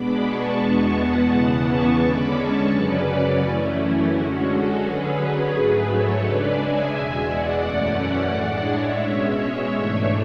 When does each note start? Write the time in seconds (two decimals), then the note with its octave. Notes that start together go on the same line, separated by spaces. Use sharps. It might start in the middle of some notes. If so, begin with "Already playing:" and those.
Already playing: B2 G#3 B3 D4 B5 D6
0.25 A5 C#6
0.60 E2 B2 G#3 B3 A5 C#6
0.95 F#5 A5
1.30 E2 C#3 E3 B3
1.65 A5 C#6
2.00 D3 G#3 C#4 B5 D6
2.35 A5 C#6
2.71 F#2 C#3 F#3 C#4 B4 D5
3.41 F#2 E3 A3 C#4 E4
4.11 D3 G#3 C#4 F#4
4.46 F#4 A4
4.81 D3 F#3 C#4 G#4 B4
5.51 G#2 F#3 A3
5.87 A4 C#5
6.21 C#3 G#3 D4 B4 D5
6.56 E5 G#5
6.92 E2 B2 G#3
7.26 D5 F#5
7.62 F#2 E3 A3 C#4
8.31 A2 G#3 D4
8.67 C#5 E5
9.03 B2 G#3 C#4
9.37 C#5 E5
9.73 G#2 E3 A3 D4